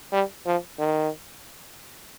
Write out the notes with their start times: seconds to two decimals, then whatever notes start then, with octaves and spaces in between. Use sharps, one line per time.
0.12 G3
0.46 F3
0.79 D#3